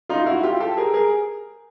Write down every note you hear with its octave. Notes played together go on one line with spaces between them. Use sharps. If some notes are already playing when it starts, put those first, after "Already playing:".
D#4 F4
E4 F#4
F4 G4
G4 A4
G#4 A#4
G#4 A#4